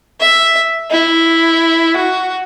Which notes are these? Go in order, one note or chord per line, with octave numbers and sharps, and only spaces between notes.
E5
E4
F#4